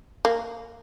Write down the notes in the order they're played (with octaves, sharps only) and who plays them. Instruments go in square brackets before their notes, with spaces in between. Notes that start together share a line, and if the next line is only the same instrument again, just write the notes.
[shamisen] A#3